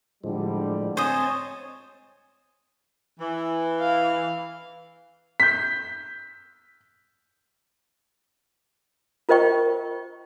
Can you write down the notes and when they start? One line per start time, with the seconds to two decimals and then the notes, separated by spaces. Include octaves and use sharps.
0.24 A2 D3 F3 G3 G#3
0.97 C4 C5 C#5 D#5 G#5 A5
3.19 E3
3.80 F5
5.40 G6 B6
9.29 F4 A#4 C5 D#5 G5 C#6